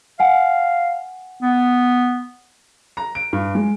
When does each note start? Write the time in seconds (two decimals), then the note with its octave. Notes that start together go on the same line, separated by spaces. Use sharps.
0.20 F5 F#5 G#5
1.42 B3
2.97 A#5
3.15 D7
3.33 G2
3.55 G#3